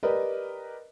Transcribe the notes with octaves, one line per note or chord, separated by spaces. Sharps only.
G4 A#4 B4 D5 D#5